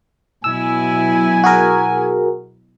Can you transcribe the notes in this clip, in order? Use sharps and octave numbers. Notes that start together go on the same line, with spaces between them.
B2 F#3 E4 G#5 E6
F#4 G#4 A#4